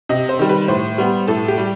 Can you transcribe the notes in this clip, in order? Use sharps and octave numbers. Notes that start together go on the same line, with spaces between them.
C3 D#5
C5
D#3 G3
B4
A2 C5
G3 B3
A2 A4
G4
G3